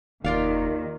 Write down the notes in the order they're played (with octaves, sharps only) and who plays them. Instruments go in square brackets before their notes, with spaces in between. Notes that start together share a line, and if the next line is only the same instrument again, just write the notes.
[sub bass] F1 [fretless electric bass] D#2 [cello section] D#3 [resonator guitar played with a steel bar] F4 D5 F5